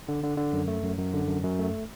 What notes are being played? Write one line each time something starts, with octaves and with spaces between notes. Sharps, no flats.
D3
D3
D3
F#2
A3
F#2
F#2
D3
F#2
F#2
A3